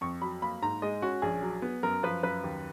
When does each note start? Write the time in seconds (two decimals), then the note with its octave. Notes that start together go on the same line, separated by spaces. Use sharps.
0.01 F2 C#6
0.22 F#3 B5
0.42 A#3 B5
0.62 G#2 A#5
0.82 G#3 D#5
1.02 C#4 F#4
1.22 A#1 G#4
1.42 F#3
1.62 B3
1.83 F#2 A#4
2.03 F3 B4
2.23 F#2 B4
2.44 D#2